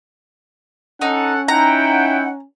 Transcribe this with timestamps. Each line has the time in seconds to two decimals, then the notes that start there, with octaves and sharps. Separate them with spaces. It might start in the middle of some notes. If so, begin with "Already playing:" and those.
1.02 C#4 D#4 A4 F#5
1.48 D#4 E4 F#5 G5 A#5